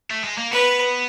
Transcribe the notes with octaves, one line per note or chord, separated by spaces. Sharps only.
A3
G#3
A#3
B3 B4